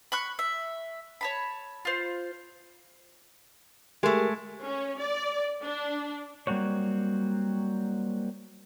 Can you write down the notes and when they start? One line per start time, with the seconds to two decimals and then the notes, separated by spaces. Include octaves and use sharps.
0.12 B5 C#6 F#6
0.39 E5
1.21 C#5 A5 B5
1.85 F4 C5
4.03 G#3 A3 G4 G#4 A#4
4.64 C#4
4.99 D5
5.63 D4
6.47 F#3 G3 A#3 C4 F#4 C#5